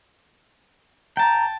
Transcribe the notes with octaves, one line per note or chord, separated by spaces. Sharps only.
G5 A5 A#5